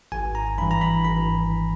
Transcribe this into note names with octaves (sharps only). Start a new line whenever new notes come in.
G#1 G#5
A#5
G2 E3 B5
A#5
B5
G#1 B5